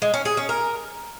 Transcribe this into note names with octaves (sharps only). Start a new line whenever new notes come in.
G#3
C#4
G#4
C#4
A#4